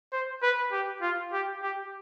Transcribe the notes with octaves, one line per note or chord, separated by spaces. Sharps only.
C5
B4
G4
F4
G4
G4